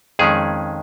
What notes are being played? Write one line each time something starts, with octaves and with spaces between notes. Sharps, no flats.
F2 D#3 G#3 C#4 G#4